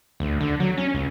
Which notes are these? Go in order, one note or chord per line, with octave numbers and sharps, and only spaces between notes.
D2
D3
F#3
C#4
C#2